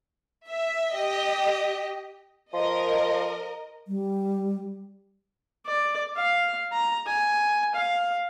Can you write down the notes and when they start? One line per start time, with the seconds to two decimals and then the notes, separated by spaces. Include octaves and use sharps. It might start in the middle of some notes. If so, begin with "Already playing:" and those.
0.47 E5
0.94 G4 D#5
2.53 F3 A#4 D#5
3.88 G3
5.66 D5
6.17 F5
6.72 A#5
7.07 G#5
7.75 F5